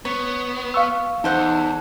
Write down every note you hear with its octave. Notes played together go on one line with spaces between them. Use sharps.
B3 C#5
F5 C#6 E6
E2 D#4 A4 C5 F#5